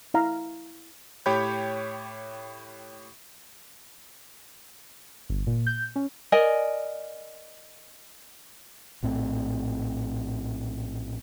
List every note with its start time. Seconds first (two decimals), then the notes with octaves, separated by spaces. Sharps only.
0.14 E4 F5 A#5
1.26 A2 G4 C#5 G5 B5 G6
5.30 G1
5.47 A#2
5.67 G6
5.96 C#4
6.32 A#4 D5 D#5 G#5
9.03 A#1 A2 C4